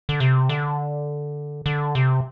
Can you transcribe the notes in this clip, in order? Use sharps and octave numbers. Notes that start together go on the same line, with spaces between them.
D3
C3
D3
D3
C3